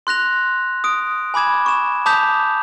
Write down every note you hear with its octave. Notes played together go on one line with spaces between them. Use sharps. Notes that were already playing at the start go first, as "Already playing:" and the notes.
C6 F#6 A#6 F7
D#6 D7
G#5 B5 D6 G#6 E7
C#6 E7
A5 D6 D#6 G6 B6 F7